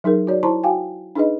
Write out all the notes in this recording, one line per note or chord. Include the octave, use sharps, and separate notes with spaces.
F#3 D#4 G#4 A#4
F#4 C#5 D5
E4 C5 A5 A#5 C6
F#4 F5 G5 G#5
D4 D#4 G#4 B4 D#5